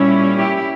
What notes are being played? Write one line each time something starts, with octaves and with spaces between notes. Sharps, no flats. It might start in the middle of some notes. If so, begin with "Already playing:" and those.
Already playing: A#2 G3 C#4 E4
E4 G4